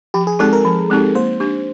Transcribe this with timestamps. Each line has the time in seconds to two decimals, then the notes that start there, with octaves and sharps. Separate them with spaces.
0.14 F3 G4
0.27 G#4
0.39 G#3 C4 D#4 G4 A4
0.53 A#4
0.65 F3
0.90 G#3 C4 D#4 G4
1.15 A#3 C5
1.40 D4 G4